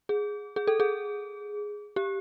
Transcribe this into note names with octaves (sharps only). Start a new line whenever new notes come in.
G#4
G#4
A4
G#4
G4